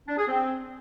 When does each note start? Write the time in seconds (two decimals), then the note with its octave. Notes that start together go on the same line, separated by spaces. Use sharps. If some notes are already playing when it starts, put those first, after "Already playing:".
0.08 D4
0.18 G#4
0.28 C4